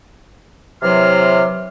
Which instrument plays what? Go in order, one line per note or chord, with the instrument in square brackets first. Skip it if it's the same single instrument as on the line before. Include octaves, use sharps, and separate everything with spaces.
[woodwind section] C3 E3 F#3 C6 F6